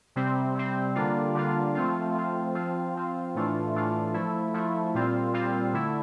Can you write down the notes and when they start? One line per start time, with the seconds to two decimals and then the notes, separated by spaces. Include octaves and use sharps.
0.16 C3 G3 C4
0.55 C3 G3 C4
0.95 D3 G3 A#3 D4 F4
1.35 D3 G3 A#3 D4 F4
1.75 F3 A3 C4 F4
2.15 F3 A3 C4 F4
2.55 F3 C4 F4
2.95 F3 C4 F4
3.35 A2 E3 A3 D4 F4
3.75 A2 E3 A3 D4 F4
4.14 F3 A3 E4
4.54 F3 A3 E4
4.94 A#2 G3 C4 F4
5.34 A#2 G3 C4 F4
5.73 D3 A3 E4